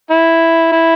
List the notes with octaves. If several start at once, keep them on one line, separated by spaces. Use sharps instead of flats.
E4
E4